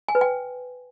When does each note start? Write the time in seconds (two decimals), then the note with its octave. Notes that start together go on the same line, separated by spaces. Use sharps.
0.08 G#5
0.15 B4
0.21 G5